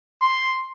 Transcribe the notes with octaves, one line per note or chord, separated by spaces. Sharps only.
C6